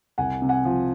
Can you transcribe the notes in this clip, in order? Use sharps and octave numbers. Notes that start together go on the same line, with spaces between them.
C2 F#5 G#5
C3
F#5 G#5
F3